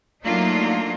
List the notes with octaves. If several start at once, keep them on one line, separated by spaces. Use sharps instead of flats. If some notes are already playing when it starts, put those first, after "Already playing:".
F#3 A3 A#3 D4 D#4 F4